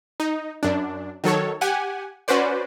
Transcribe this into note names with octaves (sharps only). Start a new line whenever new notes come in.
D#4
F#2 D4
D#3 F#3 A4 C#5
G4 F#5 G#5
C#4 F#4 B4 C5 D5